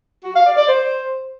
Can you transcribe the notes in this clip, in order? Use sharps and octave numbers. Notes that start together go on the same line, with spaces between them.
F#4
F5
D5
D5
C5